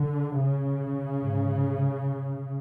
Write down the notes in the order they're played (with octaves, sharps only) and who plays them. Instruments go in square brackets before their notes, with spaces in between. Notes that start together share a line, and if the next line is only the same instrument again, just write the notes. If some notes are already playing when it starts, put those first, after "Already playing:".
Already playing: [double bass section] D3
C#3
G#2